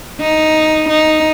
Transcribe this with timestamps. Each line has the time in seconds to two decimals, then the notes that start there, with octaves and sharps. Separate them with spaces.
0.21 D#4
0.89 D#4